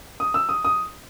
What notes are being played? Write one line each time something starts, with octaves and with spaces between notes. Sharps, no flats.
D#6
E6
D#6
D#6